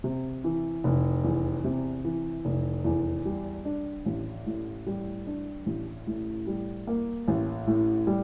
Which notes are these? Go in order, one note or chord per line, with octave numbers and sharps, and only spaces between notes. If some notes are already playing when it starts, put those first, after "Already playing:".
C3
E3
F1
E2
C3
E3
F1
E2
G3
D4
A1
A2
G3
D4
A1
A2
G3
A#3
A1
A2
G3